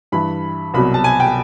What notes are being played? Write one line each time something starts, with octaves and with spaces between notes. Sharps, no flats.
G2 E3 B5
C2 B2 F#3 B5
A5
G#5
G5